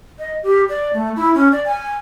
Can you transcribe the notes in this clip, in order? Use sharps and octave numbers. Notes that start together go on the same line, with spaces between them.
D#5
G4
D5
A3
E4
C#4
D5
G#5